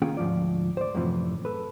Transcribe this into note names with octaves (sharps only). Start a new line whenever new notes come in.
D#3 A#3 C#4 F4 G#4 G5
D2 G#2 F3 F4 D5
C5 D5
F#2 A2 C3 E3 F3
A4 B4